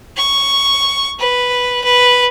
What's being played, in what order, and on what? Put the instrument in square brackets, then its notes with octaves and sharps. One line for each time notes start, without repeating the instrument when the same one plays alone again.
[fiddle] C#6
B4
B4